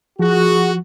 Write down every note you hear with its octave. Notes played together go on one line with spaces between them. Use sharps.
F3 F#4 G#4